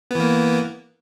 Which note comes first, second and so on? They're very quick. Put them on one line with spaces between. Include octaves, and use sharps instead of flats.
B3 E3 A#3